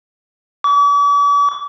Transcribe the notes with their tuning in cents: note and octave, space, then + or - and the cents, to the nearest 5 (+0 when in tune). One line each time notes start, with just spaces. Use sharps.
D6 -45